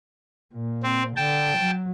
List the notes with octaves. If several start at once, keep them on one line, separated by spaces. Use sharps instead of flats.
A#2
C4
D3 G5 A5
F#3